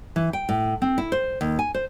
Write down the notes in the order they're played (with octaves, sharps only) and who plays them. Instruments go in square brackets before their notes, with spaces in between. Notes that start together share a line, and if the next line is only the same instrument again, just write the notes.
[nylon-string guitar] E3
G5
A2
C4
E4
C5
D#2
G#5
C5